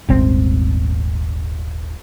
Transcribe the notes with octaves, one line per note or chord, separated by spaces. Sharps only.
D#1 G#1 C4